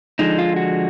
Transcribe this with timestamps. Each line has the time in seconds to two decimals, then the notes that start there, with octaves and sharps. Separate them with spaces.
0.19 D3 F3 G#3 D#4
0.39 F4
0.56 F#4